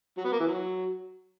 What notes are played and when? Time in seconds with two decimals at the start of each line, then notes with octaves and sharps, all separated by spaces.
0.17 F#3
0.25 B3
0.32 A#3
0.39 E3
0.47 F#3